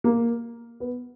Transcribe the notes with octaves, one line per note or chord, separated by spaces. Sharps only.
A#3
B3